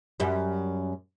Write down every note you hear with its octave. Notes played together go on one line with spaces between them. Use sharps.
F#2 G3